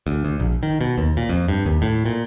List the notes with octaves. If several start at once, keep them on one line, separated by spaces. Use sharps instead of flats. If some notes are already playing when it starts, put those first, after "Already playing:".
D2
D2
A#1
D#3
B2
D#2
A#2
F2
G2
D#2
A2
A#2